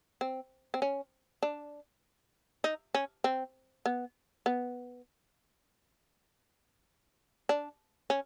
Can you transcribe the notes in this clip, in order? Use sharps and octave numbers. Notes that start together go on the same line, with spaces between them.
C4
C4
C#4
D4
D#4
C#4
C4
B3
B3
D4
C#4